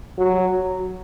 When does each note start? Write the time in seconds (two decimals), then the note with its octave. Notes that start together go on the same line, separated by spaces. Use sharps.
0.18 F#3